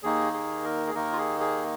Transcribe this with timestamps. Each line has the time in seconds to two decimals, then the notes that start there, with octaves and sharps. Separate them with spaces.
0.03 D#2 D#3 A#3 D#4 G#4
0.33 G#4
0.64 A#4
0.87 G#4
0.95 D#2 D#3 A#3 D#4 A#4
1.13 F4
1.18 G#4
1.40 G#4